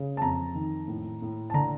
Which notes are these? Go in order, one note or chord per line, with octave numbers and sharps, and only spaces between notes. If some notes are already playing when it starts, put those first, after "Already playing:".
Already playing: C#3
A5
F2 A#5
D#3
A2
A2
A5
D3 A#5